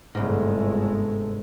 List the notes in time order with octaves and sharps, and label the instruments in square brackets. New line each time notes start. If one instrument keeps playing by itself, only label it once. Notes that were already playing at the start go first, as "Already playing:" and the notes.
[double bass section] G1 G#3 A3 [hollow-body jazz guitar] C2 G#2